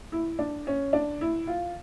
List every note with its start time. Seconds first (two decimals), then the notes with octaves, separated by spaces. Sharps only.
0.12 E4
0.39 D4
0.67 C#4
0.93 D4
1.21 E4
1.47 F4